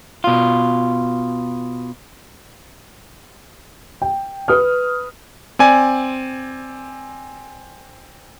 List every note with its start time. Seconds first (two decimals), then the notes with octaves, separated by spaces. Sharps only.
0.24 B2 F4
4.02 G5
4.48 B4 D#6 F6
5.59 C4 D5 G#5